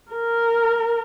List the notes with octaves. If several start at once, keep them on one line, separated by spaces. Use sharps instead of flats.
A#4